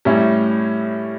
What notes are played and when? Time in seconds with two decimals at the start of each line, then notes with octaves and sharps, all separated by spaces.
0.05 A2 G3 C#4 E4